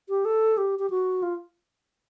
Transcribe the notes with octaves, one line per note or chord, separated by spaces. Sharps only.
G4
A4
G4
G4
F#4
F4